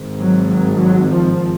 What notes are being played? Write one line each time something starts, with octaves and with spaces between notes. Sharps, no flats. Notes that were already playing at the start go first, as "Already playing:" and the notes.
Already playing: G#1 G#2
F#3
F#3
F#3
F3